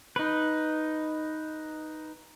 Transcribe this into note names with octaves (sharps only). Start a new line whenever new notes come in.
D#4 B4